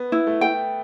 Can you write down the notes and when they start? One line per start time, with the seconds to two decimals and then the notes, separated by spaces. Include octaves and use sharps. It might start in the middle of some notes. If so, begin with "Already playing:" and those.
Already playing: B3
0.12 E4
0.27 A3
0.41 G5